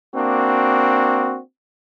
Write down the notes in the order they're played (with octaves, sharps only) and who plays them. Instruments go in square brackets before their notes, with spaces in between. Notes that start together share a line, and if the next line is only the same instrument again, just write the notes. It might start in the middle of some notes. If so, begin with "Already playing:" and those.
[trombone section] A#3 C4 D4 F#4